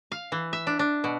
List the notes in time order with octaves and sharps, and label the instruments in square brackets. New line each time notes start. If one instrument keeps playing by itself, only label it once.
[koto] F5
E3
E5
D4
D4
B2